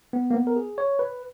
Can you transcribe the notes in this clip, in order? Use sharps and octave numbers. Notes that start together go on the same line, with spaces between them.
B3
A#3
B3
A#4
G#4
C#5
B4